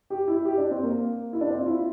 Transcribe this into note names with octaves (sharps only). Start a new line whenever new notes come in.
G4
E4
G4
D4
C4
A#3
E4
D4
C4
F4
E4